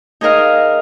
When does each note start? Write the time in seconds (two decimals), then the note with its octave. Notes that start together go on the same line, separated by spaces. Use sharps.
0.21 D#4 G#4 A#4 D#5 F5